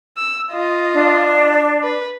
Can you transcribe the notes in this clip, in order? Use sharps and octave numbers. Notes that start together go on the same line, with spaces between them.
E6
F4 D#5
D4
B4